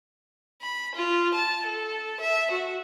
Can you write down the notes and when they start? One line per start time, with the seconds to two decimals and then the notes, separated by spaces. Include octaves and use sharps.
0.62 B5
0.95 F4
1.34 A5
1.67 A4
2.20 E5
2.51 F#4